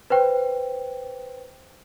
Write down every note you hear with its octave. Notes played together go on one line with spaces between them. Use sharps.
B4 C5 G5